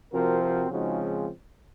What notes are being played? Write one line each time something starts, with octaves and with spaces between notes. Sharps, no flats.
C3 F3 C4 F#4 A#4
F#4 A#4
C#3 F3 G#3 C4 D#4 F#4